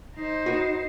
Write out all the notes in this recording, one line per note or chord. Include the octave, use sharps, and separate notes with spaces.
D#4 C5
F#4 B4